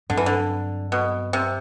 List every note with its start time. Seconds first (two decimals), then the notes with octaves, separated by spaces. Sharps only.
0.09 G2 D3 F#3 C4
0.17 E3
0.26 D3
0.92 B2
1.33 C3